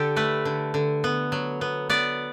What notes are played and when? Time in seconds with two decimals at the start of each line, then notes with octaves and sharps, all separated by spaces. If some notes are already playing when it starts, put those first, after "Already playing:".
Already playing: D3 G4 A4
0.16 A3 B4
0.45 D3
0.74 D3
1.04 B3
1.32 F#3
1.61 B3
1.90 B3 D5